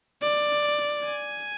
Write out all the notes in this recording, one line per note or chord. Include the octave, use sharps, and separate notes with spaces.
D5
G#5